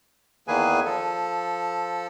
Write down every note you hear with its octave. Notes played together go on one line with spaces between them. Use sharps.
E2 D#3 A#3 G#4 B4 G#5
F3 A4